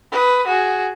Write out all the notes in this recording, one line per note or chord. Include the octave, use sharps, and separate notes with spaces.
B4 D#6
F#4 G#4